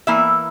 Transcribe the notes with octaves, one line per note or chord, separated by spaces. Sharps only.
E3 A#3 E4 E5